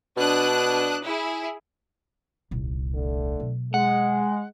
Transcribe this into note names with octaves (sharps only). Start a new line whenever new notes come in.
B2 D4 D#6 F#6
E4 G#4
D#1 C2
D3 A3
B2 F#3
G#3 F#5